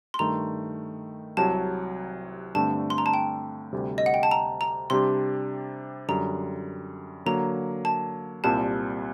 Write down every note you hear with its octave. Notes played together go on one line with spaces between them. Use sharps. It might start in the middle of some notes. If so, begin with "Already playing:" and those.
C6
G2 D#3 A3 A#5
C2 C3 F#3 A5
G2 D3 A3 C4 A5
C6
A#5
A5
G5
D2 C3 G3
D#5
F#5
G5
A5
A#5
A#5
C3 G3 D4 G4 C6
F#2 D3 G3 A#5
D3 F#3 A#3 A#5
A5
C2 A#2 G3 C4 A5